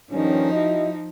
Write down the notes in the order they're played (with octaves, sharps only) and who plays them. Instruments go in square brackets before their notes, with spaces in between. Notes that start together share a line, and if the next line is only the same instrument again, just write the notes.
[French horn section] G2 D#3 C#4 [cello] F3 D#4
[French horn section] E4 F#4 D#5